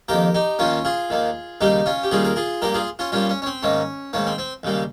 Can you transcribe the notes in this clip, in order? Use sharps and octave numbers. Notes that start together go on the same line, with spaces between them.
F2 D#3 A#3 G4 A#4
D#4 G4
D#2 D#3 A#3 C#4 F4
F4 G#4
D#2 D#3 A#3
D#2 C#3 G3 A#3 D#4 G4
C#4 F4
G4
D#2 C#3 G3 A#3 F4 G#4
A#4
F4 G#4
G2 G3 A#3 G4 A#4
F4 G#4
C#4 F4
G2 G3 A#3 C#4 F4
C#4
C#4
C4
G#2 D#3 A#3 C#4
G#2 D#3 A#3 C#4
C4
C4
D#2 C#3 G3 A#3